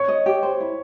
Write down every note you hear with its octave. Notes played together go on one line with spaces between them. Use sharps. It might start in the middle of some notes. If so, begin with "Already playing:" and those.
Already playing: C#5 C#6
D#5
G4
C5
E4